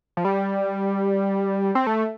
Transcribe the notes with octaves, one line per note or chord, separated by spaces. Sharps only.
F3
G3
C4
A3